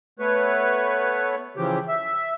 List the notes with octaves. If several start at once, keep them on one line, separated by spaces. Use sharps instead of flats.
A3 B3 B4 C#5
C#3 E3 F3 G4
E5